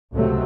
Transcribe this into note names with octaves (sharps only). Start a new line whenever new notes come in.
C#2 C3 F#3 A3